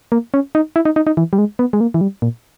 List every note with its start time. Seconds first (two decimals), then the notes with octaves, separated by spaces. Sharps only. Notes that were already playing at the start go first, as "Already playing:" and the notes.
0.12 A#3
0.34 C#4
0.55 D#4
0.76 E4
0.85 D#4
0.96 D#4
1.07 D#4
1.17 E3
1.33 G3
1.38 G#3
1.59 B3
1.73 G#3
1.81 A#3
1.94 E3
2.01 G3
2.22 A#2